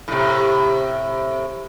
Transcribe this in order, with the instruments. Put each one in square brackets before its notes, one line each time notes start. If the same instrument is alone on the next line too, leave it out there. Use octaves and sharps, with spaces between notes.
[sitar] A2 C3